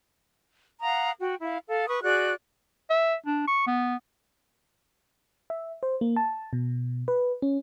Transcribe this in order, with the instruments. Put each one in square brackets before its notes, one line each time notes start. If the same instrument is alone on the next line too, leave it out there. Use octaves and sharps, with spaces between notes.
[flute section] F5 F#5 A#5 D#6
F#4 G5
E4 F5
A4 F5
B4 C#6 D#6
F#4 G#4 D5 F#6
[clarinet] E5
D4
C#6
B3
[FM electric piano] E5
C5
A#3
A5
B2
B4
C#4